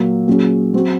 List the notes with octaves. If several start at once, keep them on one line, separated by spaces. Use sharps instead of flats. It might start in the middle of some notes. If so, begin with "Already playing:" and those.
Already playing: A#2 F#3 A#3
A#2 F#3 C#4 G#4
F#3 C4 F#4